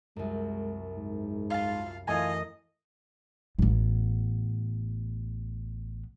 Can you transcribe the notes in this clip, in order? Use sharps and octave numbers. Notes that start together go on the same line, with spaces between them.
C2 F#2 G#3
G#2
F4 F5 A5
F#2 E3 A3 F4 D#5 G#5 A#6
A1 B3